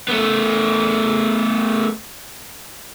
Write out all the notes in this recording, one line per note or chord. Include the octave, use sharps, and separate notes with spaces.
A3 B3